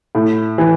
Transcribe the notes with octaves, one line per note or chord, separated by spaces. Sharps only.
A2
E3